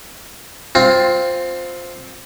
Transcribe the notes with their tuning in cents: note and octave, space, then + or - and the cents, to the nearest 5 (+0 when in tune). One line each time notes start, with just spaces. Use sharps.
C4 +0 F4 +15